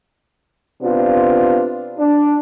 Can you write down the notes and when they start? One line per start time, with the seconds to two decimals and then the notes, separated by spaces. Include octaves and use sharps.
0.82 C3 B3 D4 F4
1.98 D4